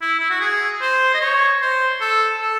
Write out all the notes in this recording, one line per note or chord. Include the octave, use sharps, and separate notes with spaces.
E4
E4
F#4
G#4
C5
D#5
C#5
C5
A4
A4